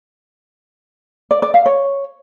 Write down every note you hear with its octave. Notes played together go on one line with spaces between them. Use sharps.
D5
D5
F5
C#5